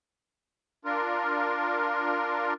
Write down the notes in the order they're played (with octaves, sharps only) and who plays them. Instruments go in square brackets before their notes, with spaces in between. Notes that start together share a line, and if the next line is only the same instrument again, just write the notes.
[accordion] D4 F4 A#4